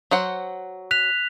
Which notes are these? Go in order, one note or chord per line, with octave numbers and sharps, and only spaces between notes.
F#3 C5 F#5
F#6 B6 F7